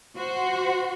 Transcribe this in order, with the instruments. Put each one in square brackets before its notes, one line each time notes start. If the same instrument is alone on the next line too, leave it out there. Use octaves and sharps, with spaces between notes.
[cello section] F#4 C5